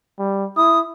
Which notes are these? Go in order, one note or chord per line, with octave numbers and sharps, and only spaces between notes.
G3
E4 D#6